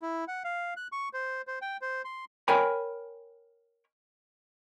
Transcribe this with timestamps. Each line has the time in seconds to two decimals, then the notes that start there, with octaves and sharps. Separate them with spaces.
0.02 E4
0.28 F#5
0.44 F5
0.77 F#6
0.92 C#6
1.13 C5
1.47 C5
1.62 G5
1.82 C5
2.05 C6
2.48 A#4 C#5 G5 G#5 B5